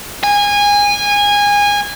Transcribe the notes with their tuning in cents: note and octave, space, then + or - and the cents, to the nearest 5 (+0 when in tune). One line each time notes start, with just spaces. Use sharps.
G#5 -20